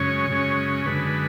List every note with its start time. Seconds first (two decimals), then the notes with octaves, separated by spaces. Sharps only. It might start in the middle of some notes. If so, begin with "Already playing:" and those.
Already playing: F#2 C#3 G#3 C#4 C#5
0.30 F#2 C#3 G#3 C#4
0.86 F#2 D3 G#3 B4